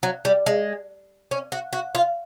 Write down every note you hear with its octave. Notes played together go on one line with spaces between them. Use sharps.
F#3
G3
G#3
C#4
F#4
F#4
F4